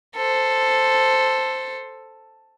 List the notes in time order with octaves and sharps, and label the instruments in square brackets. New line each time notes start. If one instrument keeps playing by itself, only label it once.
[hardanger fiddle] A4 C5